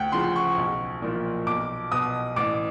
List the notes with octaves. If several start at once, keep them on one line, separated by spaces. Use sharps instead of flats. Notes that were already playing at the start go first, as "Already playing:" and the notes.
Already playing: D2 F#5 G5
C#3 F3 C6
C#6
B1
A#2 F3
B1 D6
B2 D#6
A1 D6